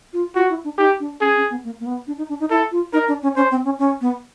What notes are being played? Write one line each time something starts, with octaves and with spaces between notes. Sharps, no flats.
F4
F4 F#4
E4
D4
D#4 G4
D4
C#4 G#4
C#4
B3
A#3
A#3
B3
D4
D#4
D4
D#4
E4 A4
F4
D#4 A#4
D4
C#4
C#4 C5
C4
C#4
C#4
B3